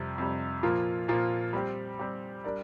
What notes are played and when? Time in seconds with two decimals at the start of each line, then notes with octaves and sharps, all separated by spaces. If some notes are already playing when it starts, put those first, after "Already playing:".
Already playing: F2 C3 G3
0.18 F2 C3 G3
0.63 A#2 F3 A#3 F4
1.08 A#2 F3 A#3 F4
1.53 G3 C4 G4
1.99 G3 C4 G4
2.44 G3 D4 A#4 D5